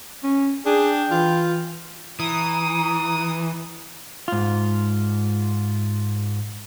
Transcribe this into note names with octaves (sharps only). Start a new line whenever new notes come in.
C#4
D4 G#4 G5
E3 F4
E3 A#5 D#6
G#2 F4